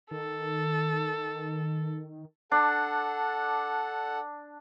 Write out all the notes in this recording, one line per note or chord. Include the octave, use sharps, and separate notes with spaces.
D#3 A4
D4 A4 F#5